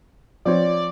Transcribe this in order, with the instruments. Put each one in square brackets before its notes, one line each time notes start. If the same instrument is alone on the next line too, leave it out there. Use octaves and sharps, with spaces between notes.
[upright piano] F3 C4 C#5 [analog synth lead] D5